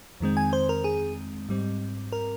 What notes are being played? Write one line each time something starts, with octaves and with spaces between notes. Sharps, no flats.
F2 D#3 G#3 C4
G#5
C5
A#4
G#4
G#2 G3 C4
A#4